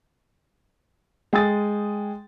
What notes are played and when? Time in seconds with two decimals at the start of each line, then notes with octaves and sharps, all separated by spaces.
1.33 G#3 G5 G#5 D#6 A6